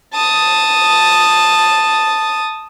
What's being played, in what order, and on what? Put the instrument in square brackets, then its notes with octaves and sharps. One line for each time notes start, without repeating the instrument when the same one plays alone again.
[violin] A5 D#6